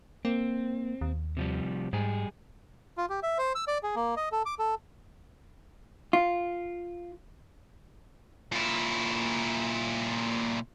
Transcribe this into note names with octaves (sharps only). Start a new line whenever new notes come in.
A#3 C4
D#2
C3 F3 G3
G#2 G3 G#4
F4
G4
E5
C5
E6
D5
G#4
A#3
D#5
A4
D6
A4
F4
A#2 E4